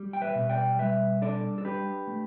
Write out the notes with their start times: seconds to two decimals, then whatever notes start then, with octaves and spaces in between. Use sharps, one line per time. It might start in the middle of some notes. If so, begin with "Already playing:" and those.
Already playing: G3
0.13 G5
0.22 B4 E5
0.35 B2
0.49 D5 G5
0.79 G3 B4 E5
1.22 D4 A4 D5
1.58 A4
1.64 D4 G4 B4
2.07 A3